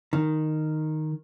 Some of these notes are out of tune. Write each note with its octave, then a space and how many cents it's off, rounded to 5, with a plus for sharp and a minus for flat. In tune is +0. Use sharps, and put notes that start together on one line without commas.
D#3 -5